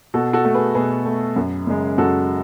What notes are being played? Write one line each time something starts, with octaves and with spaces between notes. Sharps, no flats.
B2 F#4 A4
F#4 A4
A3
G#4 B4
B2 G#4 B4
A3
F#2
C#3 G#3
F#2 F#4 A4